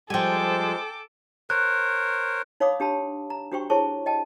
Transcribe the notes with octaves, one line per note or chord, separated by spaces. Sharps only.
F3 G3 G#3 A4 C5 G5 G#5 D6
A#4 C5 C#5 F#6
D#4 C#5 F5 B5 D6 D#6
D4 G4 A5 B5
A#5
D4 F#4 G4 C5 G5 C#6
E4 G#4 C5 C#5 A5 C#6
D#5 G5 A5